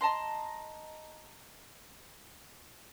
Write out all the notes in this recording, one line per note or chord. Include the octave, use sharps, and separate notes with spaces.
D#5 A5 A#5 C6